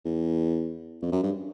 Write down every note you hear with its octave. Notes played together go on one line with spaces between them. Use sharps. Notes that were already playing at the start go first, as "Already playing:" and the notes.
E2
F2
F#2
G2